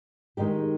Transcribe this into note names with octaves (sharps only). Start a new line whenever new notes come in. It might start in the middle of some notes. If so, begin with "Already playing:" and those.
D#3 G#3 D#4 G4